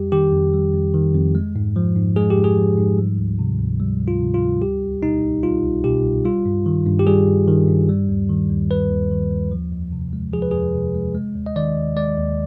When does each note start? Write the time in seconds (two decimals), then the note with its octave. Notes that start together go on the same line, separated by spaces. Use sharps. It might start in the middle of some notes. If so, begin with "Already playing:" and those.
Already playing: F2 G3 G4
0.12 D#3 G4
0.32 F2
0.54 G3
0.74 F2
0.94 D#3
1.14 F2
1.35 G#3
1.56 G#2
1.76 F3
1.96 G#2
2.16 G#3 G#4
2.30 G4
2.37 G#2
2.44 G#4
2.58 F3
2.78 G#2
2.98 G3
3.18 D2
3.39 C3
3.59 D2
3.80 G3
4.00 D2
4.08 F4
4.21 C3
4.34 F4
4.41 D2
4.62 G3 G4
4.82 C2
5.02 B2 D#4
5.23 C2
5.43 G3 F4
5.64 C2
5.84 B2 G4
6.05 C2
6.25 G3 F4
6.46 G2
6.66 D#3
6.87 G2
6.99 G4
7.07 G3 G#4
7.27 G2
7.48 D#3
7.68 G2
7.89 G3
8.09 D#2
8.29 D#3
8.50 D#2
8.71 G3 B4
8.90 D#2
9.11 D#3
9.31 D#2
9.51 F3
9.72 F2
9.92 C3
10.13 G#3
10.33 F3 G#4
10.42 B4
10.51 G#4
10.54 F2
10.74 C3
10.95 G#3
11.15 G#3
11.36 D#2
11.46 D#5
11.56 D#3 D5
11.76 D#2
11.96 G#3 D5
12.18 D#2